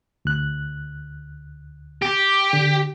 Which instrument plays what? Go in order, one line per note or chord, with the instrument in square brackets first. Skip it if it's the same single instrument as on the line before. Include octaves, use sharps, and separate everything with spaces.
[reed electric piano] D2 F#6
[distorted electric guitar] G4
[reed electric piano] D3